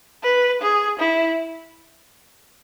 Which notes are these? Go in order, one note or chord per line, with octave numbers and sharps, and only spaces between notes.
B4
G#4
E4